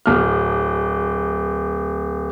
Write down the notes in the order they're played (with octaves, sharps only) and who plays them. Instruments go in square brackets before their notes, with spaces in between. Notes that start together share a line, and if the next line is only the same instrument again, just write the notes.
[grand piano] D1 F6